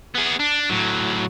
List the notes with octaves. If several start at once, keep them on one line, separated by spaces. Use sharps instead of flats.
B3 G#4
D4
A2 F#3